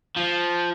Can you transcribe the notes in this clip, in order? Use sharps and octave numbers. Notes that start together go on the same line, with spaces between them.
F3